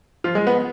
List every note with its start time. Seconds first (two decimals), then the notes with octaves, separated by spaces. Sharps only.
0.24 F3 F4
0.35 G#3 G#4
0.47 B3 B4